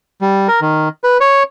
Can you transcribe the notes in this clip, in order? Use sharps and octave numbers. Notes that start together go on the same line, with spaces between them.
G3
A#4
D#3
B4
C#5